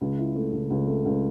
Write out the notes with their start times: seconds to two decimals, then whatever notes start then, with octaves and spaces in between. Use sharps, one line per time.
0.01 C#2
0.18 E4
0.35 A3
0.53 C#2
0.70 C#2
0.87 A3
1.05 C#2